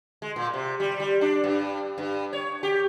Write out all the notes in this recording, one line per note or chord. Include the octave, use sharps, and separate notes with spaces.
G#3
A#2
C3
G3
G3
D4
G2
G2
C#5
G4